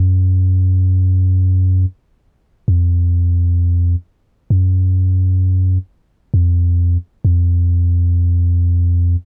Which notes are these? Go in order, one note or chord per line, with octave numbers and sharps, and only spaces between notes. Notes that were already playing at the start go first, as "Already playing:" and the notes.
Already playing: F#2
F2
F#2
F2
F2